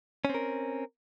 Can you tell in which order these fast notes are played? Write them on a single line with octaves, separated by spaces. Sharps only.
C#4 C4 A#4